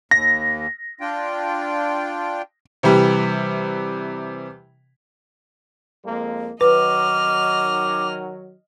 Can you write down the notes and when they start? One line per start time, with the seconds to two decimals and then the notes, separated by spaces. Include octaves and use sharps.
0.11 D#2 A#6
1.01 D4 F4 G5
2.83 C3 E3 G3
6.04 F2 G#3 A#3
6.61 D#3 F#3 B4 D#5 D6 F6